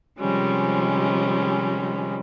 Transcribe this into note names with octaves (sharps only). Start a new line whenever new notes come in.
C3 D#3 F3 G3 G#3 C#4